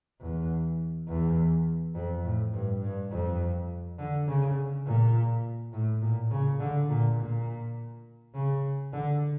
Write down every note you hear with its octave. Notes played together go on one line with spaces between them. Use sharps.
E2
E2
F2
A2
G2
G2
F2
D3
C#3
A#2
A2
A#2
C#3
D3
A#2
A#2
C#3
D3